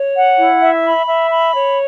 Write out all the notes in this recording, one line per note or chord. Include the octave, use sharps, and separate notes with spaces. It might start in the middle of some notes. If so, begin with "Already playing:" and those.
Already playing: C#5
F#5
E4
E5
B5
E5
B5
C#5